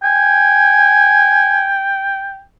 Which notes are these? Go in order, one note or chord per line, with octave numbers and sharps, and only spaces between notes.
G5 G#5